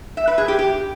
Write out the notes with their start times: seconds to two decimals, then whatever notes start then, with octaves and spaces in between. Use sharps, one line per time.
0.17 E5
0.27 B4
0.38 G#4
0.48 G4
0.59 G4